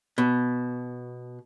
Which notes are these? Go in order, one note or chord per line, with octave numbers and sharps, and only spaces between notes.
B2